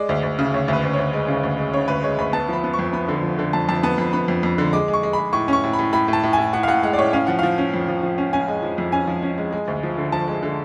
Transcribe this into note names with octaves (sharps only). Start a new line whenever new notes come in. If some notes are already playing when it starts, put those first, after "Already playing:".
Already playing: G#3 D5
D2
D2
C#3
D2 C#5
D2 B4
D2
C#5
D2
G#3
C#3
D2
G#3
C#3 C#5
D2 B4
G#3 C#5
D2 B5
B3 A5
F3 B5
B3
C#6
F2
B3 B5
D3
F3
D3
F2 A5
F2 A5
B3 A5
F2 B5
B3 B5
F2
F2
D3
G#3 D6
G#3
C#6
G#3
G#3 B5
A2 C#6
C#4 C#6
A2
B5
A2
A2 B5
A2 A5
A2
G#5
A2
A2 F#5
F5
A2 F#5
G#3 F#5
D5
A2 C#5
C#4 F5
F3 F#5
F3 F5
C#4
F2
F3
F3
C#4
C#4 G#5
G#3
F3
F2
C#4 G#5
F3
C#4
G#3
G#3
D2
F3
D3
F3 A5
G#3
D3